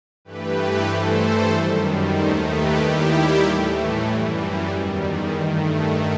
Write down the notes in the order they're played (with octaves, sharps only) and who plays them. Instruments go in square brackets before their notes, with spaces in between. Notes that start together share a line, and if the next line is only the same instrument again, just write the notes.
[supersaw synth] G2 E3 A3 G4 B4
G2 E3 A3 A4 C5
F#2 D#3 G3
D#2 D#3 A3 A4 C5
G4 B4
D#2 D#3 G3 E4 G4
A2 E3 A3
F#2 E3 G3
E2 D#3 G3
G2 D#3 A3